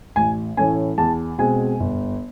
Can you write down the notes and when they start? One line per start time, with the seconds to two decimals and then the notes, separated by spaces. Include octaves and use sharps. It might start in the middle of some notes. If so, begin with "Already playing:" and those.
0.16 A1 G#5
0.57 A2 E3 A3 C#4 G#5
0.98 E2 A5
1.38 B2 G#3 C4 G#5
1.80 G1